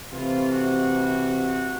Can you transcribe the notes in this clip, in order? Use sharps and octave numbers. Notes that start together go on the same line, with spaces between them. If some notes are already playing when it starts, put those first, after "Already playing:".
C3 E3 A3 F4
F#4